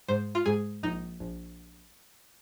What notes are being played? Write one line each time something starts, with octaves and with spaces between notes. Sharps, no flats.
G#2 C5
F4
G#2 G#4
A#1 D#4
A#1